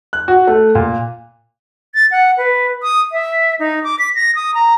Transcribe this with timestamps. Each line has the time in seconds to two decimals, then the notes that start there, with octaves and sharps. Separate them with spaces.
0.13 F#6
0.28 F#4
0.47 A3
0.75 A#2
1.94 A6
2.11 F#5
2.38 B4
2.83 D#6
3.12 E5
3.59 D#4
3.84 D6
3.99 B6
4.15 A#6
4.35 D#6
4.54 A#5